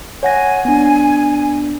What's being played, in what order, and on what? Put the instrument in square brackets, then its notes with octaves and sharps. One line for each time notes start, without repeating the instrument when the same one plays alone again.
[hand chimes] C#5 F#5 A#6 [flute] G#5
[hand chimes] B3 D4